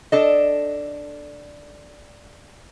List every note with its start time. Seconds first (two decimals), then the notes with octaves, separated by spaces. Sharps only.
0.12 D4 A4 D#5